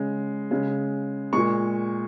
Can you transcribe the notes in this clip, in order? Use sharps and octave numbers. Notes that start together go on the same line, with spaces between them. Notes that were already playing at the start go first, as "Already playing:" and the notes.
Already playing: C#3 G#3
C#3 G#3
A#2 G#3 C#6